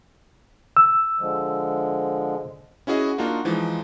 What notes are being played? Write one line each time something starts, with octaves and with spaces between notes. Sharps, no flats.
E6
D3 F3 G#3
C#4 E4 F#4 G#4 D#5
A#3 D4 D#4 F4 F#4
E3 F3 G#3 D#4